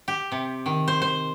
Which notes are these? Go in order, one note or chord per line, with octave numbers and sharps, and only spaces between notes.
G4
C3
D#3
C5
C5